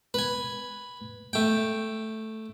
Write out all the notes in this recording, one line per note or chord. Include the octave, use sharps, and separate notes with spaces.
B4 G#5
A3 G5